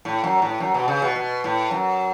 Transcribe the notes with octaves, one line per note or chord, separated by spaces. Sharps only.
A2
F#2
A2
F#2
B2
C#3
B2
B2
A2
F#2